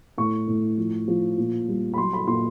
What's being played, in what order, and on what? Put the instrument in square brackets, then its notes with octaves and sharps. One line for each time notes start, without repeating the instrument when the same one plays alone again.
[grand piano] A2 C#6
A2
F3
F3
A#2
G3
B5
F#3 C6
B5
A#2 C6